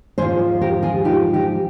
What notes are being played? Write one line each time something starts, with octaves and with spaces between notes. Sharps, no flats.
G#2 F3 G#4 C5
G4 A#4
F4 G#4
D#4 G4
D#4 G4